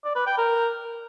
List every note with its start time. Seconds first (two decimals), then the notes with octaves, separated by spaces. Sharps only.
0.05 D5
0.16 B4
0.27 G5
0.38 A#4